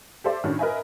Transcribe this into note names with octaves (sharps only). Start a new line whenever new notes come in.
G4 A4 C5 D5 E5
A2 D#3 C#4 D4 F#4
A#4 B4 D#5 E5 G#5